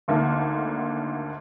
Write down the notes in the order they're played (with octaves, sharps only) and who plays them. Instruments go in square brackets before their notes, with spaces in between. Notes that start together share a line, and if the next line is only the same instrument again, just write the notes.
[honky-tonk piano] G#1 D2 D3 A#3 D4 F6